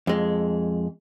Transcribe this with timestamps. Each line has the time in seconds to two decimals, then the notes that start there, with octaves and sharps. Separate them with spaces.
0.07 F2 G#3